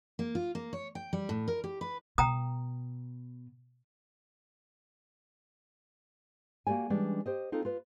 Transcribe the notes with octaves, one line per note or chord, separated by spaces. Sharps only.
A#3
F4
A#3
C#5
G5
G3
A2
A#4
G4
B4
B2 G5 A#5 D#6
A#3 F#4 G4 D5 G#5
E3 G3 G#3 C#4 D4
G4 C5 D#5
C4 D#4 F4 A4
F4 B4